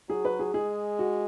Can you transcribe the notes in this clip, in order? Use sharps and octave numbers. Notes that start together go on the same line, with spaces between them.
F#3 G#4
B4
G#4
G#3 G#4
F#4